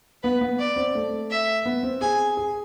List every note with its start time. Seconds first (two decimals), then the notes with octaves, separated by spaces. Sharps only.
0.23 B3 B4
0.41 B3
0.59 D5
0.76 C4
0.95 A3
1.31 E5
1.65 B3
1.83 C4
2.01 G#4 G#5
2.37 G#4